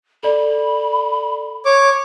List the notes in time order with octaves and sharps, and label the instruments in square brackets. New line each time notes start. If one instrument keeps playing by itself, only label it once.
[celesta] A4 D5 [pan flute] B5
[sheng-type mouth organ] C#5 D6